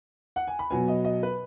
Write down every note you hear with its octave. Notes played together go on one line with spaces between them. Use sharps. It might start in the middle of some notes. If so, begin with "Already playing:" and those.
F#5
G#5
B5
B2 F#3 B3 G#5
D#5
D#5
B4